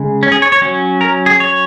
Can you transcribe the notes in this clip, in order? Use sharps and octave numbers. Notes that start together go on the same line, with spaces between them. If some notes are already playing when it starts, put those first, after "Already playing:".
Already playing: C#3 G#3
C#4
G#4
C#5
C#5
F#3 C#4
A#4
G#4
C#5